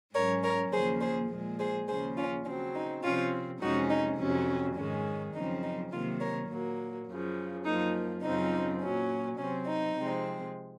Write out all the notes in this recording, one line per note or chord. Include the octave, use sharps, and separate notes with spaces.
G#2 F#3 C#4 A#4 C#5
A#4 C#5
D#2 C#3 F3 A#3 G#4 C5
G#4 C5
A#2 F3 G#3
G#4 C5
D#2 C#3 F3 G#4 C5
C#4 F4
C#3 F#3 C4 C#4
D#4
C3 F3 C4 C#4 F4
F2 C3 F3 G#3 C#4 D#4 F#4
D#4
F2 C3 F#3 C#4
G#2 D#3 G#3 C#4
F#2 C#3 F3 C4 D#4
D#4
C3 D#3 F#3 A#3 C#4 F4
A#4 C#5
A#2 F#3 A#3
F#2 C#3 F3
F#2 F3 A#3 D#4
F#2 C#3 F3 C4 D#4
A#2 F#3 C#4
C3 F#3 C4 C#4
D#4
C3 F3 G#3 C4